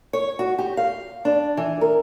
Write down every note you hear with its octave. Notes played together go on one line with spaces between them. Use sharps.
C#5
F#4
G4
F5
D4
E3
A#4